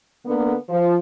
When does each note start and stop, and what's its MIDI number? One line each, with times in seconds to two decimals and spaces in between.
0.25 0.54 50
0.25 0.54 58
0.25 0.54 59
0.69 0.96 53